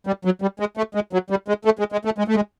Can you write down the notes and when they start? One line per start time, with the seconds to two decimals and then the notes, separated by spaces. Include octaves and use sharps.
0.07 G3
0.25 F#3
0.42 G3
0.60 G#3
0.77 A3
0.95 G#3
1.13 F#3
1.30 G3
1.48 G#3
1.65 A3
1.79 G#3
1.92 G#3
2.05 A3
2.18 G#3
2.28 A3
2.35 G#3